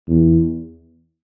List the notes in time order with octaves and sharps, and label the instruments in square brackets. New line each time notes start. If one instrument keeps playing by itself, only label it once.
[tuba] E2